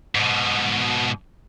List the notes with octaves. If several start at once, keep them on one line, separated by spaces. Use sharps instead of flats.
G#2 B2